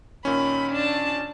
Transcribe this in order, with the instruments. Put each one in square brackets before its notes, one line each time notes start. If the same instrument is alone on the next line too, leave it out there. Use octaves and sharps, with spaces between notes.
[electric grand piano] A#2 D#3 C#4 [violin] B5
[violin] D4 A5